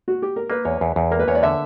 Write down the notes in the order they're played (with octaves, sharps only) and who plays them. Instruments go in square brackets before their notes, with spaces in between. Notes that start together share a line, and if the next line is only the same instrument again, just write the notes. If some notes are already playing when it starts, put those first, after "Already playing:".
[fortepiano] F#4
G4
A#4
[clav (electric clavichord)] A#3 [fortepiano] B4
[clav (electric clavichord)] E2 [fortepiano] C#5
[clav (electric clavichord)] E2
E2
[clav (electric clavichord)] A#3 [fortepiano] A#4
[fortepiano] B4
[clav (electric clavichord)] E2 [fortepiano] C#5
[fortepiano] D5
[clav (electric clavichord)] D3 [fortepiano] E5